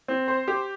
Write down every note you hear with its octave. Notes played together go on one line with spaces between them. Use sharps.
C4
C5
G4